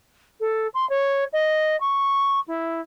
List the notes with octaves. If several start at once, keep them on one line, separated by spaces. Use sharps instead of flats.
A4
C6
C#5
D#5
C#6
E4